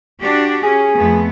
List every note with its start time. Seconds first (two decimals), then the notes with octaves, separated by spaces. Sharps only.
0.21 D4 F#4 G4
0.63 C#4 G#4
0.97 F2 A3 B3